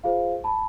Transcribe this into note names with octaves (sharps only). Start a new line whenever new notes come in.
F4 G#4 C5 F5
A5 B5